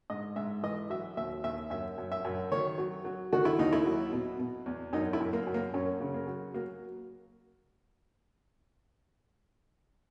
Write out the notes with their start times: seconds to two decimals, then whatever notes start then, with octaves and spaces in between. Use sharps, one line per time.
0.10 G#2 D#5
0.36 G#2 E5
0.63 E3 D#5
0.90 F#3 E5
1.17 D#2 E5
1.44 D#2 E5
1.70 F#2 E5
1.98 F#2
2.12 E5
2.25 F#2
2.52 D#3 C#5
2.78 F#3
3.05 F#3
3.33 D#3 F#4
3.45 E4
3.59 D#2 D#4
3.73 E4
3.85 F#3
4.13 B2
4.39 B2
4.66 E2
4.93 F#2 D#4
5.13 E4
5.20 F#2
5.33 A#3
5.47 F#2
5.54 A#3
5.74 F#2 C#4
6.00 C#3
6.14 A#3
6.27 F#3
6.54 F#3 A#3